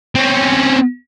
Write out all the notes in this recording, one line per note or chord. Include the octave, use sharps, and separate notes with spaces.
C4 C#4